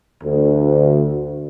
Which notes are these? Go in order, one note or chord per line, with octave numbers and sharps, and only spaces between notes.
D2